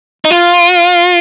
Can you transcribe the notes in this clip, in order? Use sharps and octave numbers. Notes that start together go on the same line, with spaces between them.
D#4
F4